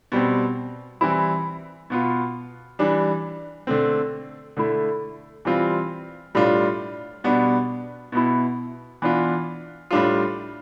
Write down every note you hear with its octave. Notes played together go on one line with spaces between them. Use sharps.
B2 G3 C4
E3 G3 C4 E4
B2 B3 F4
E3 G3 D4
D3 A3 C4
D3 A3 E4
E3 G3 C4 F4
A2 G3 D4 F4
B2 G3 B3 D4
B2 B3 E4
E3 B3 D4 F4
A2 G3 D4 F4